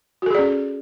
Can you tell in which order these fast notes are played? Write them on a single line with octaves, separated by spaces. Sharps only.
F#4 A4 G#4 D5 C#4